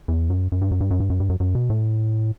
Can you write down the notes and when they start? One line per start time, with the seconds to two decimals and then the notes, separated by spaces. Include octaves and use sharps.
0.08 E2
0.30 F#2
0.52 F#2
0.62 G2
0.71 F#2
0.81 G2
0.91 F#2
1.00 G2
1.10 F#2
1.20 G2
1.29 F#2
1.40 F#2
1.55 B2
1.70 A2